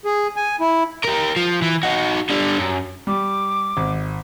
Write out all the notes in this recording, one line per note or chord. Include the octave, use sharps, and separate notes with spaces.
G#4
G#5
E4
G4 A#4
F3
E3
D#4 F#4
D3 G3
F#2
G3 D6
G#1